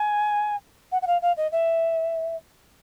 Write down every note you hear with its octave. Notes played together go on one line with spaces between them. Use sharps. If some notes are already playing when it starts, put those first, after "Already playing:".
Already playing: G#5
F#5
F#5
F5
F5
D#5
E5